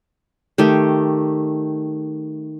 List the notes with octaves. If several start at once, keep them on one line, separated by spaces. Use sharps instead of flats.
D#3 A3 G4